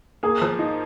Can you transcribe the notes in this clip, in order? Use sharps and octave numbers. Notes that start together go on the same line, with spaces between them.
A#3 G#4
F3
D#4